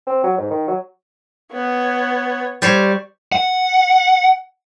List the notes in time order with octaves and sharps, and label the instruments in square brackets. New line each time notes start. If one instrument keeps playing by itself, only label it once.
[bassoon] C4
F#3
G#2
D#3
F#3
[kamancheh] B3 C#5
[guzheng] G3 C5 C#5
[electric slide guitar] F#5